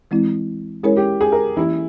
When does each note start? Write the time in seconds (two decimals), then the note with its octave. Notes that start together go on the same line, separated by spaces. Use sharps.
0.11 E3 G#3 C4 E4
0.83 G#3 C#4 E4 G#4 A#4 C#5
0.97 G4
1.21 G#4
1.32 A#4
1.56 E3 A#3 C#4 E4 G4